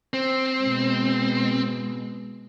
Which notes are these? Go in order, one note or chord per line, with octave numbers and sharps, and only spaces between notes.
C4
B2 G#3